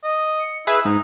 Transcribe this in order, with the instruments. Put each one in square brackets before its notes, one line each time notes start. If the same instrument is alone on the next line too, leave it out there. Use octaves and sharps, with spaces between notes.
[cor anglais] D#5
[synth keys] C#7
[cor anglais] E4 [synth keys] G#4 B4 E5
[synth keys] G#2 [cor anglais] D#4